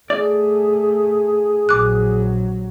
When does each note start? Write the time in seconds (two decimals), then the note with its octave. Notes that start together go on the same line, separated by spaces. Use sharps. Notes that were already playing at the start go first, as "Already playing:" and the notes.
0.10 A3 G#4 D5
1.69 A#1 F#3 D6 F#6